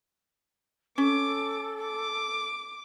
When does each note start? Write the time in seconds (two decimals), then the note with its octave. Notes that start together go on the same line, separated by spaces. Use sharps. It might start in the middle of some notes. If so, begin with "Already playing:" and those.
0.98 C#4 A4 D6
1.82 D6